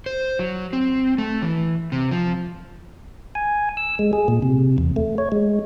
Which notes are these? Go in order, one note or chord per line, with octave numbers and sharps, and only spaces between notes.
C5
F#3
C4
A3
E3
C3
F3
G#5
E6
G#3
G#4
A#2
C3
E2
A3
C#5
G#3